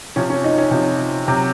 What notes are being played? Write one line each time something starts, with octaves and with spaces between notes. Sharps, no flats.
C3 F3 C#4
C#4
D#4
C#4
C3 F3
C3 F#3